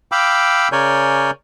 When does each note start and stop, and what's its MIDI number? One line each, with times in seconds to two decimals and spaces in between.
0.12 0.68 77
0.12 0.68 79
0.12 0.68 83
0.12 0.68 86
0.12 0.68 88
0.72 1.31 49
0.72 1.31 70
0.72 1.31 73
0.72 1.31 74
0.72 1.31 80
0.72 1.31 91